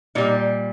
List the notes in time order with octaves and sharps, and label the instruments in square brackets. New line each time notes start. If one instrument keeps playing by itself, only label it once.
[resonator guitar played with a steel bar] A#2 G3 D#4